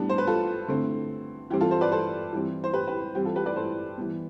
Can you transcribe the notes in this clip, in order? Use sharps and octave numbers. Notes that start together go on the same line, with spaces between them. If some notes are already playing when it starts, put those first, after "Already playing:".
Already playing: A2 G3 B3 D4
C5
B4
F4 A4
D3 A3 C4
E3 G3 C4 G4
F4 A4
A4 C5
B4 D5
A4 C5
E3 G3 C4
C5
G4 B4
G4 B4
E3 G3 C4 G4
F4 A4
G4 B4
B4 D5
A4 C5
E3 G3 B3